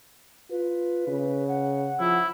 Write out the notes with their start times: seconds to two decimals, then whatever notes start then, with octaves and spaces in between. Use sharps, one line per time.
0.50 F4 B4
1.08 C#3
1.48 F#5
2.00 F3 E4